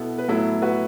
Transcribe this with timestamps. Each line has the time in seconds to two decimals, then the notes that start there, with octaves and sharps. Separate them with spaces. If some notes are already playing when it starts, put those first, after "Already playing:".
Already playing: B2 B3 E4 A4
0.18 B4
0.28 A2 F#3 B3 E4 A4
0.62 F#4 B4